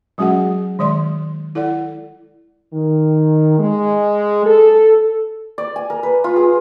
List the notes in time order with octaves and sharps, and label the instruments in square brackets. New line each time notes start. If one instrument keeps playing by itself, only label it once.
[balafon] F#3 G#3 C#4 F#4 G#4 F#5
D#3 G#3 D5 C6
E4 A4 D5 F#5
[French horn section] D#3
G#3
A4
[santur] D5
G#5
A#4
B4
F4
G#4